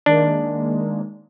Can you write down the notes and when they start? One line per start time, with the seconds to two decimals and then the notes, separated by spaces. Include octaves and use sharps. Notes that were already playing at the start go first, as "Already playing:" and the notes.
0.06 D#3 G#3 A#3 D4